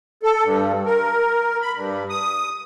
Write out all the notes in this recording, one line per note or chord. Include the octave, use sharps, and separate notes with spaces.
A4
G2
A#4
B5
G2
D#6